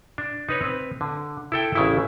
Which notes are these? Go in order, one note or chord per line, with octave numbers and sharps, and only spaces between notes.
D4
D#4 B4 C#5
C4 B4
D3
E4 A4 G5
A1 C#3 E4